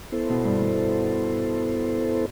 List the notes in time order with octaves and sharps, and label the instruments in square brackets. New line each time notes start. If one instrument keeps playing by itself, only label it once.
[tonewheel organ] B3 E4 A4 C5
[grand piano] B2
G2
G2